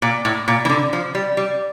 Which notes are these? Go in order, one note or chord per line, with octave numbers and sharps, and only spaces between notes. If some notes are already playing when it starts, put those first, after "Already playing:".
A#2
A2
A#2
E3
D3
F3
G3
G3